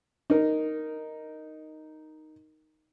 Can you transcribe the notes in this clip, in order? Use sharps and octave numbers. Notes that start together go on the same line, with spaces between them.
D#4 A#4